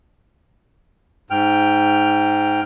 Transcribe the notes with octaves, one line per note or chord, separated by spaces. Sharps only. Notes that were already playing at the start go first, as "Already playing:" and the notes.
G#2 G5 F6